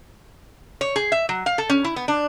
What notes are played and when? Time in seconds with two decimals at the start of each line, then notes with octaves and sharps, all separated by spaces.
0.81 C#5
0.96 G#4
1.12 E5
1.29 F#3
1.46 F5
1.58 A4
1.69 C#4
1.84 E4
1.96 B3
2.08 D4